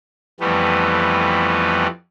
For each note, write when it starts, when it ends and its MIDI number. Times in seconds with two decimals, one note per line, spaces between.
0.40 1.87 41
0.40 1.87 52
0.40 1.87 55
0.40 1.87 57
0.40 1.87 59